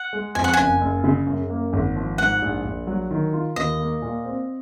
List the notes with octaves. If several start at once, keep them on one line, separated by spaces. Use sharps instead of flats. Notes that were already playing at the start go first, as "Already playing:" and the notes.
Already playing: F#5
G#3
F2 G#5
F#5
F#1 G#5
F#1
C#3
F#2
A#3
G#1
F3
G#2 F#5
A#1
A#1
F#3
D#3
F4
D#2 D#5
A#3
A#2
C4